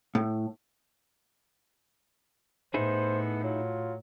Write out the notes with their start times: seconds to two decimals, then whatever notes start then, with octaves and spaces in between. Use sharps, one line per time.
0.15 A2
2.74 A2 B3 D#4 E4 G#4 C5
3.44 F#3 F4